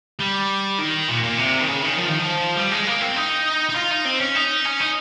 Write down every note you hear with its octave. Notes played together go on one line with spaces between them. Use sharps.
G3
D#3
A#2
A#2
C3
D#3
C#3
D#3
F3
D#3
F3
G3
G#3
A#3
C4
D#4
D#4
F4
D#4
C4
C#4
D#4
C#4
D#4